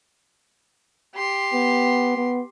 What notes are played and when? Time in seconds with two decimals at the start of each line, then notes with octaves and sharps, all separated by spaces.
1.15 G4 C6
1.53 B3
2.17 B3